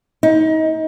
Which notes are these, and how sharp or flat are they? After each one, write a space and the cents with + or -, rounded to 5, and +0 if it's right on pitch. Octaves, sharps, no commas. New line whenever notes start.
D#4 +30